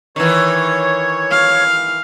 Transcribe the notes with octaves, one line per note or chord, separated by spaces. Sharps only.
D#3 E3 C#5
F5